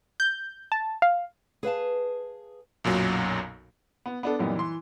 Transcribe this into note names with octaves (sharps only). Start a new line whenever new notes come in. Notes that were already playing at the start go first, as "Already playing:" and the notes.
G6
A5
F5
G#4 B4 F5 A5
B1 F#2 A#2 F#3
B3
B3 D4 A4
F#2 A#2 E3 G3 B3 D#4
E3 C6